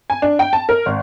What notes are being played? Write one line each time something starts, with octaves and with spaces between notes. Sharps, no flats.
G#5
D4
G5
A5
A#4
G#1